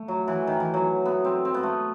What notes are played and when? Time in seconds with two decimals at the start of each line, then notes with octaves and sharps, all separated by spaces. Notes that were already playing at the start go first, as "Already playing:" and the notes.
Already playing: A3
0.08 F#3
0.28 E3
0.47 D#3
0.60 E3
0.74 F#3
1.06 B3
1.25 C4
1.45 C4
1.54 B3
1.63 A3